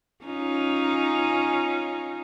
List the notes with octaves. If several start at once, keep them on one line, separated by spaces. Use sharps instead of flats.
C#4 D#4 F4